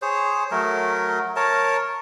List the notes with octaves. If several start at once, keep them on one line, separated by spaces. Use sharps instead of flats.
G#4 C5 C#5
F#3 A3 A#4
A#4 C#5 A5